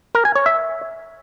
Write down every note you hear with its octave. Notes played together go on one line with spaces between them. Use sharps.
A#4
G#5
C#5
E5